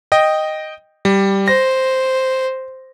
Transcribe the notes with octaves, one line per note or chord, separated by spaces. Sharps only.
D#5 G5
G3
C5 A#6